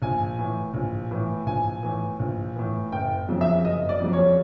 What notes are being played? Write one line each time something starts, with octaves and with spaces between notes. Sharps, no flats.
A#1 G#5
A2 E3
A#1
A2 E3
A#1 G#5
A2 E3
A#1
A2 E3
F#1 G5
F2 C#3 F#3
E5
F#1 D#5
D5
F2 C#3 F#3
C#5